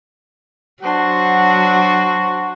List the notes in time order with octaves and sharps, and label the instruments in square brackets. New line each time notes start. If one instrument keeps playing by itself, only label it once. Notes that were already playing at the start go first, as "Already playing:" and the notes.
[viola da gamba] F#3 [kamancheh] D4 C5 [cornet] F#4